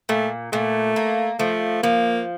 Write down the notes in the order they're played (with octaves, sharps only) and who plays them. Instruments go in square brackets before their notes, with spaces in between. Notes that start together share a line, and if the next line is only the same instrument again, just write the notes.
[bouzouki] A#2 [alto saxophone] A3
[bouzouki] A#2 [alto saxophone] A3
[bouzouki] A#3
[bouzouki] F3 [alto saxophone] A3
[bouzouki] F3 [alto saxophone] A#3